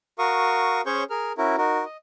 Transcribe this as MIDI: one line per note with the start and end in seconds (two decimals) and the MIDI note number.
0.19 0.81 66
0.19 0.81 70
0.19 0.81 77
0.19 0.81 85
0.19 0.81 87
0.86 1.04 61
0.86 1.04 68
0.86 1.04 72
0.86 1.04 73
0.86 1.04 85
0.86 1.04 91
1.10 1.32 68
1.10 1.32 70
1.10 1.32 89
1.38 1.56 61
1.38 1.56 64
1.38 1.56 66
1.38 1.56 70
1.58 1.85 63
1.58 1.85 66
1.58 1.85 70
1.85 1.97 75